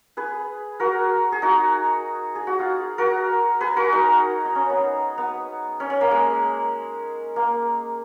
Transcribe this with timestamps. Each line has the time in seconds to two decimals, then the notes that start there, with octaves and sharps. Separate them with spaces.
0.17 G#4 B4
0.80 F#4 A#4
1.32 G#4
1.42 D#4 F#4
2.35 G#4
2.47 F#4
2.59 F4 G#4
2.98 F#4 A#4
3.60 G#4 B4
3.76 F#4 A#4
3.93 D#4
4.45 D#4
4.55 C#4
4.70 B3
5.18 B3
5.80 C#4
5.90 C#4
6.01 A#3
6.11 G#3
7.36 A#3